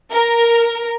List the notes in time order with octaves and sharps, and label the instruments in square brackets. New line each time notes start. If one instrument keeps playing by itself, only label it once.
[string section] A#4